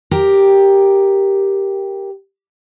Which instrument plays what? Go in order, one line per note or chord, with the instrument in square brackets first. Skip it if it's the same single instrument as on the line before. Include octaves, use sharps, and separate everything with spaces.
[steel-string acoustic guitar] G4 A#4